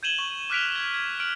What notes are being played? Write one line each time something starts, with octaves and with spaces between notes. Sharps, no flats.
G6 G#6 D#7 E7 F#7 G7
C#6
D6 F6 F#6 B6 D7 F7
G#6
G#6
F6 D7 F#7